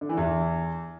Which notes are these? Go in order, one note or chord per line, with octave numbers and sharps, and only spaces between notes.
D3
E3
E2